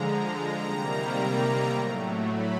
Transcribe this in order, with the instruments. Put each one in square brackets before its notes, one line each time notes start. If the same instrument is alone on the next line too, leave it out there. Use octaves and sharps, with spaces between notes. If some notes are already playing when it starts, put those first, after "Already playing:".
Already playing: [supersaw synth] D3 F3 G#3 A#5
C3 D#3 G3 A#3 A#5
A#5
A2 F#3 A3
B5